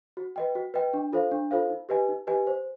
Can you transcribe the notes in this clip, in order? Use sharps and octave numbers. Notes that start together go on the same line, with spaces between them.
F#4
B4 D#5 G5
F#4
B4 D#5 G5
D4
F4 A4 C5 F5
D4
F4 A4 C5 F5
D#4
G4 B4 D#5 G#5
D#4
G4 B4 D#5 G#5
C5